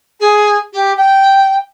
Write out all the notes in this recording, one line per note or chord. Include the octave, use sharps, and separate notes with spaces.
G#4
G4
G5